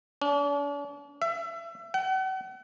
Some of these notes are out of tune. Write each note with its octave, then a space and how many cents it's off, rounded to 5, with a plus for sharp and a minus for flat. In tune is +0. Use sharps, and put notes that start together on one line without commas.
D4 -45
E5 +25
F#5 +40